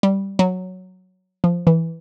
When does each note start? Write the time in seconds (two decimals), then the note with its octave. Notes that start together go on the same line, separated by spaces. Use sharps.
0.03 G3
0.39 F#3
1.44 F3
1.67 E3